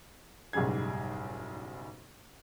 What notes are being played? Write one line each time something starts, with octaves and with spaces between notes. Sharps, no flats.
F#1 B1 G#2 G3 G#4 G#6